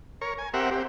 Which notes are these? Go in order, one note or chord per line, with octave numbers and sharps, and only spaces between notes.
A#4 C#5
G#5
C4 G4 A#4 E5 F#5
C4 G4